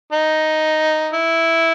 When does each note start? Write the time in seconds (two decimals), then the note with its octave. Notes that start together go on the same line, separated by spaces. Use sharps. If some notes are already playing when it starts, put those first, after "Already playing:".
0.12 D#4
1.13 E4